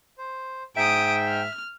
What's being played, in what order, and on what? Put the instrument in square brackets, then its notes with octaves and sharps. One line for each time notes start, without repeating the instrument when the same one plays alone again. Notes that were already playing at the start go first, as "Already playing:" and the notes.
[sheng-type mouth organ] C5
[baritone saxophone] G#2 [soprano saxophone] E5 [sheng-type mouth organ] G5 [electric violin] D#6 D7
[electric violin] F6